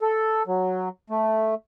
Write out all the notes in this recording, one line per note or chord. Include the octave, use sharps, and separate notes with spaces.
A4
F#3
A3